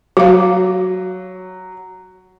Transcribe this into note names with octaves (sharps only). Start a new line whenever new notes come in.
F#3 F#4 F5